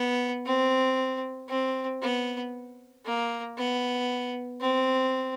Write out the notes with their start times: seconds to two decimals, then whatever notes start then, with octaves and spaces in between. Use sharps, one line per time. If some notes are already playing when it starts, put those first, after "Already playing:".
Already playing: B3
0.46 C4
1.49 C4
2.02 B3
3.05 A#3
3.58 B3
4.61 C4